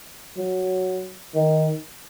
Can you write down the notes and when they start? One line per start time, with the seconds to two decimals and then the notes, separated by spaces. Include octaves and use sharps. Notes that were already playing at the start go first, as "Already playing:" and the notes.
0.37 F#3
1.35 D#3